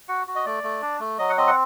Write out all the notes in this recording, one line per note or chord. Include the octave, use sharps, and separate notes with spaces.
F#4 F#5
F#4
D#5
A3 D5
A3
D4
A3
F#3 D#5
F#5
C4 D#5
F#5